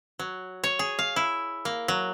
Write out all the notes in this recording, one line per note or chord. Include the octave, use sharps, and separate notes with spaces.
F#3
C#5
G#4
F5
E4
A#3
F#3